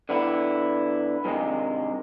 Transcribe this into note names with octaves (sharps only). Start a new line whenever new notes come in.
D3 B3 E4
G2 C3 D#3 G#3